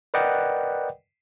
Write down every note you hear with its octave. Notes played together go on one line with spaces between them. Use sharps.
A#4 B4 D5 D#5 F#5 G5